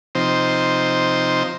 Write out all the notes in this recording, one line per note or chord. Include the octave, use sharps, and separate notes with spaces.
C3 F3 C4 D#4 C5